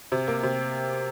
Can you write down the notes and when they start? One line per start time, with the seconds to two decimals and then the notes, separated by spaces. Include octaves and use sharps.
0.12 C3
0.27 A#3
0.43 C3